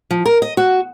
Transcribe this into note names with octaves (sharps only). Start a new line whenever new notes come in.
F3
A#4
D#5
F#4